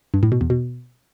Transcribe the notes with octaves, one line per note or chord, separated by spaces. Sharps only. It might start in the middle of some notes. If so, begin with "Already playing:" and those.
G2
A2
B2
E2
B2